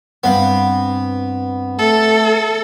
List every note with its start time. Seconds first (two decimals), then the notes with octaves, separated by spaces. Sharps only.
0.24 G2 B3 C4 F5
1.79 A3 A4